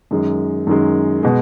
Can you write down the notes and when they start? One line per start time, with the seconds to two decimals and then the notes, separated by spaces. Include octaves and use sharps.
0.11 F#2 D#3 G#3
0.67 F#2 D#3 G#3
1.23 B2 G#3